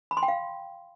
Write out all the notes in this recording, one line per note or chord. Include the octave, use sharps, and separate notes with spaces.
B5
C6
G5
F5